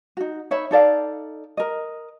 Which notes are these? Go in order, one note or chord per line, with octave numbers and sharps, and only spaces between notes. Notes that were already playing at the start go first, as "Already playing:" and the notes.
D#4 F#4
D#4 C#5 E5 B5
D#4 A4 D5 F5
A#4 D#5